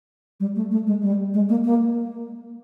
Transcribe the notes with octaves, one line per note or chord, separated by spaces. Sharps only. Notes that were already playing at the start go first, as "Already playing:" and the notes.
G3
A3
A3
G#3
G3
G#3
A#3
A#3